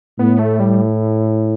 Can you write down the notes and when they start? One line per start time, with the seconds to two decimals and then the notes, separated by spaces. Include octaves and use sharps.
0.19 A2 B3
0.39 A3
0.60 G3